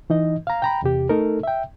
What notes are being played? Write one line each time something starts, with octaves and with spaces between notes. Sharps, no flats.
E3 D#4 D#5
F5 A#5
G5 A#5 B5
E2 C3 G4
A3 D#4 A4 A#4
E5 G5